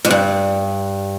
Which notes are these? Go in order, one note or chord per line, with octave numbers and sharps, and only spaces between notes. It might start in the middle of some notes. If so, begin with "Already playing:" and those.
G#2
G2